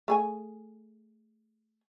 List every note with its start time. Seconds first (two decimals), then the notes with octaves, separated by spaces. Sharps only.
0.08 A3 G#4 G#5